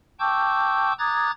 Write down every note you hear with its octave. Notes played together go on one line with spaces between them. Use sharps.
G5 A5 C#6 D6 E6 G6
A#5 D6 D#6 F#6 G#6 A6